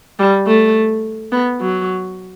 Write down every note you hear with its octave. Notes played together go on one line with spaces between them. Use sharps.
G3
A3
B3
F#3